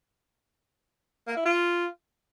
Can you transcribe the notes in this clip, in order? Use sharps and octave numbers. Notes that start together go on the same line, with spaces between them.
A#3
E4
F4